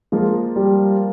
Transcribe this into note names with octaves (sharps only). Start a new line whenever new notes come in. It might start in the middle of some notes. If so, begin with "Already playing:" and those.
F3 G#3 A#3 F4 A#4
G3